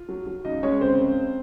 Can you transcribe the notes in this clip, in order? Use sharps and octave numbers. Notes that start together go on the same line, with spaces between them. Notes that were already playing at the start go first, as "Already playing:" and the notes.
Already playing: F4
F#3
F#3
C#2 D#4 D#5
G#3 C#4 C#5
C#3 C4 C5
C#2